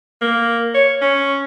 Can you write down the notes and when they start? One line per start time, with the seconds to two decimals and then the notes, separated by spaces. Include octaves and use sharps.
0.22 A#3
0.75 C#5
1.02 C#4